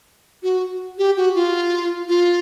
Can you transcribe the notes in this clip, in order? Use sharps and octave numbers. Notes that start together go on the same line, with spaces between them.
F#4
G4
F#4
F4
F4